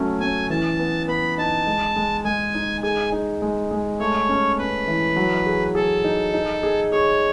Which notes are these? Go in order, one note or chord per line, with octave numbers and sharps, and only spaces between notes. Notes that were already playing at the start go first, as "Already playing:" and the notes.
Already playing: F#3 A3 C#4
C#4 G#5
E3 A5
B3
B3 B5
D#4 A5
G#3
G#3
G#3 G#5
D#4
G#4 G#5
D#4
G#3
G#3
A3 C#5
C#4
C#4 B4
E3
F#3
G#4
G#4 A4
D#4
D#4
G#4
G#4 C#5